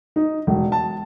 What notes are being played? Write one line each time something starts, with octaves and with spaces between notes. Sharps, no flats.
D#4
E1
A5